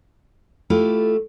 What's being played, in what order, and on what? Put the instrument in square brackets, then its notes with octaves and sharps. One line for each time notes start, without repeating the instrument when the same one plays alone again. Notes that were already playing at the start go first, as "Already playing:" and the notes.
[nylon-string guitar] A3 E4 F4 G4